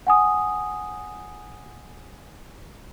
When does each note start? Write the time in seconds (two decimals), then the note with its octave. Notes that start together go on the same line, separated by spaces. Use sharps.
0.07 F#5 G#5 D#6